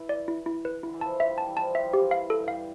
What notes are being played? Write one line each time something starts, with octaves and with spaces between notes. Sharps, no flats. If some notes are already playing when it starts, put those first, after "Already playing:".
Already playing: E3
D5
E4
E4
B4
D3 E4
E3
F3 A5
E5
G3
A5
E3
F3 A5
G3
E5
F3
G4
E3
F5
A4
G2
F5